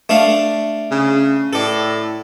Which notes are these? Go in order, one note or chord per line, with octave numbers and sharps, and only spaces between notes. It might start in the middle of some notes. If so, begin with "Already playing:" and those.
A3 D4 F5
C#3
A2 A4 D5